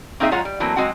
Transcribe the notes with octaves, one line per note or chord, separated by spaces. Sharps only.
A#3 C4 D#4 G#4 E5
F#3 G#3 F4 C#5 F#5 A#5
G3
E3 F#3 A3 A#3 C4
F#3 G#3 C4 F#4 F#5